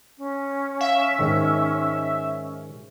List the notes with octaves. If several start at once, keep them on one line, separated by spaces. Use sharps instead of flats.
C#4
E5 F5
G#2 D#3